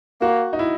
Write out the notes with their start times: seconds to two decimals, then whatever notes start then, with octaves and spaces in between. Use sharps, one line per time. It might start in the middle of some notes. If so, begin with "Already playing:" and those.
0.21 A#3 F#4
0.53 D#4
0.59 E4